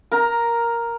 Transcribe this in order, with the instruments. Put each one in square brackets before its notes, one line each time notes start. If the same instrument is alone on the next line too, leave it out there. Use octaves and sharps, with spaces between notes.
[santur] A#4 A#5